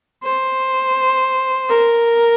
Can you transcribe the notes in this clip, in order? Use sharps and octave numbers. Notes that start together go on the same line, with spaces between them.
C5
A#4